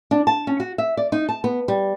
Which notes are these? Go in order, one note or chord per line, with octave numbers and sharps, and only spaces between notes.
D4
A5
C#4
F#4
E5
D5
D#4
A5
B3
G3